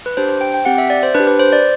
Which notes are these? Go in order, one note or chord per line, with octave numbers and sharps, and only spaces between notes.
B4
D4 G4 C5
C5
G5
G5
C4 G4 F#5
E5
D5
C5
D4 B4
G4
B4
C5
D5